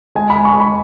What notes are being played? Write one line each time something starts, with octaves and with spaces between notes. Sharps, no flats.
G#3 G#5
B5
G#3
C#6
G#3
B5